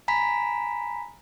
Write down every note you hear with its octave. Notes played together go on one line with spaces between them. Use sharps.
G#5 A#5 B5 B6